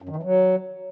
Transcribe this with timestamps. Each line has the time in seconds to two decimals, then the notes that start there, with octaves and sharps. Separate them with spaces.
0.02 F#2
0.09 D#3
0.16 E3
0.23 F#3